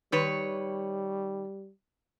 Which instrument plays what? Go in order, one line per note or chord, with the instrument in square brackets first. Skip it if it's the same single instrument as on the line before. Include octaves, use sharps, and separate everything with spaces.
[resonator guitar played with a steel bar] D#3 B4 C#5 [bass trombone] G3